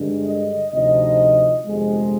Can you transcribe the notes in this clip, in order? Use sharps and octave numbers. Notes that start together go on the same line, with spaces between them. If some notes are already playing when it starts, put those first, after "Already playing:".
Already playing: G2 D3 G#3
D#5
D2 C3 F3 C4 D#4 D#5
G1 F2 C3 F3 G#3